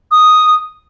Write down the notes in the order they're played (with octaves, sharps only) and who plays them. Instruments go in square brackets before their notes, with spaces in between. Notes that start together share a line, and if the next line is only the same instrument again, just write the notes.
[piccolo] D#6